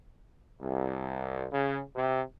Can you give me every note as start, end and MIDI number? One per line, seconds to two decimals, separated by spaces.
0.61 1.46 36
1.52 1.81 49
1.96 2.21 48